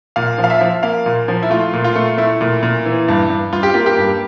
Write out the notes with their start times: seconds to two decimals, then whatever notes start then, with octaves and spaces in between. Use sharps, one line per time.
0.16 A#2 F5
0.38 F3
0.44 F5
0.50 E5
0.61 F3
0.83 A#3 F5
1.06 A#2
1.28 F3
1.43 E4
1.50 A3 F4
1.73 A#2
1.84 F4
1.95 A3
2.18 A3 E4
2.41 A#2
2.63 A#2
2.86 E3
3.08 G2
3.30 G2
3.53 G2 F4
3.63 G4
3.74 A#3 F4
3.86 G4
3.98 G2